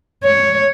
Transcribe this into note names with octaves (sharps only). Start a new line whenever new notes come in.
C#5